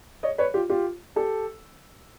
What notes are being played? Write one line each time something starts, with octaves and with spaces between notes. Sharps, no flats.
C#5 D#5
B4 C#5
F4 G4
F4 G4
G4 A4